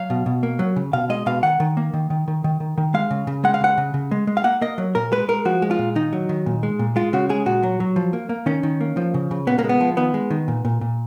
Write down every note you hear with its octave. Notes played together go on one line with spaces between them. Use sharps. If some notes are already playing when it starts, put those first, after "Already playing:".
Already playing: F#3 F5
B2
B2
A#3
F#3
C#3
B2 F5
G#3 D#5
B2 F5
D#3 F#5
D#3
A#3
D#3
D#3
D#3
D#3
D#3
D#3
G#3 F5
C#3
C#3
G#3 F#5
F5
C#3 F#5
C#3
C#3
G#3
G#3
F5
A#3 F#5
A#3 D#5
F#3
A#2 A#4
G#3 B4
G#3 A#4
F3 F#4
G#3
F4
A#2
D#3 D#4
F#3
D#3
A#2
G#3
A#2
G#3 F4
C#3 F#4
G#3 G#4
A#2 F#4
F#3
F#3
F3
A#3
A#3
D#3 C#4
D#3
A#3
F3
C#3
C#3
A#2 B3
A#3
G#3
B3
F3
D#3 B3
G#3
D#3
A#2
A#2
A#2